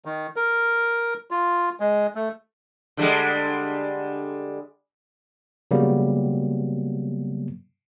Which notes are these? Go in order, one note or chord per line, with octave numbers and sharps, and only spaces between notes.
D#3
A#4
F4
G#3
A3
D3 G3 G#3
C#3 F#3 G3 A#3 B3